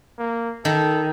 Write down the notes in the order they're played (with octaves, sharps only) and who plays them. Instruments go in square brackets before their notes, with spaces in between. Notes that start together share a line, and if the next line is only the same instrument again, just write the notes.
[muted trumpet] A#3
[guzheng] D#3 [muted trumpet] A4